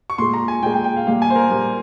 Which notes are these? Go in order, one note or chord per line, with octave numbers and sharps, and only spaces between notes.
C#6
A#2 G#3 C6
A#5
G#5
A#2 G#3 G5
G5
G5
F5
A#2 G3 A#3 F5
G#5
C5
A#4
A#2 G3 A#3